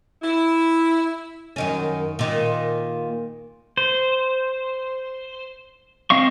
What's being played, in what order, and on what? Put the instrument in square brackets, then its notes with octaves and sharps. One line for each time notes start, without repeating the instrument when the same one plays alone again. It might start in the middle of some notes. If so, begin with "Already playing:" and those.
[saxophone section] E4
[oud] F#2 D#3 C#4
A#2 D#3
[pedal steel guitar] C5
C4 D#5 F5 C#6